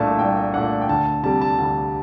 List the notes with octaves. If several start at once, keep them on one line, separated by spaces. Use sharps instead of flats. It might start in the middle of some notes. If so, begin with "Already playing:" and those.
Already playing: C2 A#2 A3 D4 A5
C2 G5
A#2 A3 D4 F#5
G5
D2 A5
C3 G3 A5
A5
D2 A5